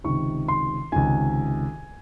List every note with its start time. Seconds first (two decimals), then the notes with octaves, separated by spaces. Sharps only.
0.04 C#2 C3 D#3 C#6
0.48 C6
0.92 C#2 C3 D#3 G#5